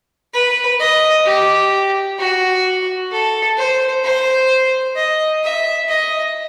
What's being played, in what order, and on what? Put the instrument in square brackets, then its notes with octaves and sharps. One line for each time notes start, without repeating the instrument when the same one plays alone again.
[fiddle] B4
D#5
G4
F#4
A4
C5
C5
D#5
E5
D#5